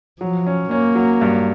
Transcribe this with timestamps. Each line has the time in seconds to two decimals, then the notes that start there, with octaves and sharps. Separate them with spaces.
0.20 F3 F#3
0.46 C#4
0.71 A#3 C#4
0.95 F#3
1.21 G2